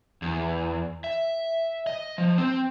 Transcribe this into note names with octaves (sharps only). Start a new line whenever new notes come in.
E2
E5
D#5
F3
C4